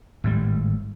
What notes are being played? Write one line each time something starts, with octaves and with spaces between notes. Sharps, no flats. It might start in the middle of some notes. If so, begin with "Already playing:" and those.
G#1 A2 C#3 G3